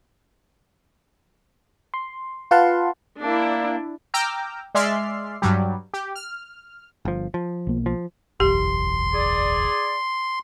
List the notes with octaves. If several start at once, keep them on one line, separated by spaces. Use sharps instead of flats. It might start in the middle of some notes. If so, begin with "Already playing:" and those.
C6
F4 B4 F5 F#5 A5 C6
A#3 D4 E4
G5 A#5 D6 E6 F6 G6
G#3 D5 E5 C6 F6 C7
G2 F#3 G3
G4
F6
G1 F3
F3
B1 A#3
F3
F#1 B1 E2 G4 C6
G#4 D5